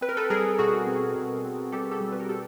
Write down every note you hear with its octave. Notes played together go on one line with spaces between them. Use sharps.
C4 B4
A#4
A4 B4
G3 G#4 A#4
B2 F#4 G#4
C4
B2
C4
G3 G4 A4
G4 A4
G3
B4
A#4
G4 A4